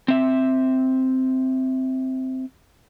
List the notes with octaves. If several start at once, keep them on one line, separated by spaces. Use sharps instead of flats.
C4 E5